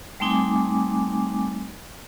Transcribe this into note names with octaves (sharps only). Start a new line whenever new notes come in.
G3 A3 C4 D#4 G#5 D6